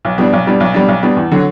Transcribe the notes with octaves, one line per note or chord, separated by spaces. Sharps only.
B1
B2 G3 D4
B1
B2 G3 D4
B1
B2 G3 D4
B1
B2 G3 D4
E2
D3 F#3